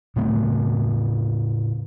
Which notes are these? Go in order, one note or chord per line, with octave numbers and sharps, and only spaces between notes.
A2 C#3 A3 C4